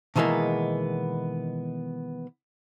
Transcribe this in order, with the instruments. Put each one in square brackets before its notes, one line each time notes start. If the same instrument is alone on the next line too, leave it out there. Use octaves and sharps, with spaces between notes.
[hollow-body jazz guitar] B2 D#3 E3 G#3 A#3 B3